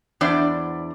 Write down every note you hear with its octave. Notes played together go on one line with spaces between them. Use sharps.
E2 B3 D4 C5 D5